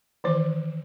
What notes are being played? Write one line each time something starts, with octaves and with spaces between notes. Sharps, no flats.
D#3 E3 C5